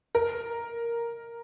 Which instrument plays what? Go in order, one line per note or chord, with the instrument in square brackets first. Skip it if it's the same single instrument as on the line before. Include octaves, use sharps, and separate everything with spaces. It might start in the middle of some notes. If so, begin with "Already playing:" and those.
[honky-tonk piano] A#4